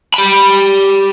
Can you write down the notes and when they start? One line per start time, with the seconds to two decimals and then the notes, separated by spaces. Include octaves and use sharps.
0.14 G4 B5